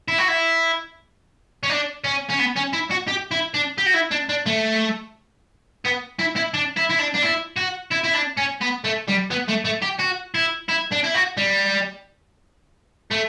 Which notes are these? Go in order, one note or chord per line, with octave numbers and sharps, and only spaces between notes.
E4
F#4
E4
C#4
D4
C#4
C#4
B3
C#4
E4
F#4
G4
E4
D4
G4
F#4
E4
D4
D4
A3
B3
E4
E4
D4
E4
E4
D4
D4
E4
F#4
E4
E4
D4
C#4
B3
A3
G3
B3
A3
A3
G4
F#4
E4
E4
D4
E4
F#4
G3
A3